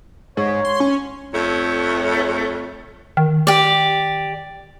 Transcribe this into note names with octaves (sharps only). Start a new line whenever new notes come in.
G#2 C#5
C6
C#4
F2 A3 C#5
D#3
G4 D5